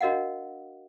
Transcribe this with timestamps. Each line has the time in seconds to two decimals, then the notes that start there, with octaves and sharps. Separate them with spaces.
0.01 D4 F#4 A#4 D#5 F5 F#5